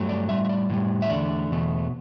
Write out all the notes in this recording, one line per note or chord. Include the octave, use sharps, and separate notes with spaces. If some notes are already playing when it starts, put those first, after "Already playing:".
Already playing: G2 F#3 A3
D5
A2 G3 E5
E5
D5
A2 E3 G3
E5
E2 D3 A3 D5
E2 B2 A3